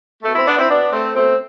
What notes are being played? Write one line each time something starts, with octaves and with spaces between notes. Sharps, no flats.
B2 A3
C4 E4
B3 D4
C4 E4
B2 B3 D4
A3 C4
B2 A3 C4